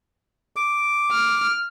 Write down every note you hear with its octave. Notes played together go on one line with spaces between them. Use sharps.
D6
F6